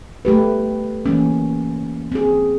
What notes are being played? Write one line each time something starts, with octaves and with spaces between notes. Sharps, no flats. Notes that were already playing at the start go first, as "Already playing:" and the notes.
A3 G4 B4
E3 A#3 C#4
C4 G#4